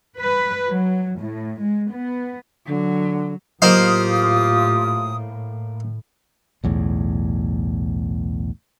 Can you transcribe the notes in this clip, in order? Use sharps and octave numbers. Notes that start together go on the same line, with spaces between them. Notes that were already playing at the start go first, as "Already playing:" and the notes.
B4
F#3
A2
G#3
B3
D3 F#3
A2 F#3 A#3 F4 G4 C5 F5 D#6
B1 E2 A2